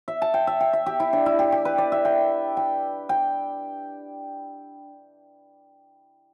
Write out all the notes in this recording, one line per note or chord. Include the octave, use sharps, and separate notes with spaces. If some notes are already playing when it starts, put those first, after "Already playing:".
E5
A5
G5
E5
G5
E5
G4
E4
D4
E4
G4
G4
B4
D5
E5
G5
G5
G5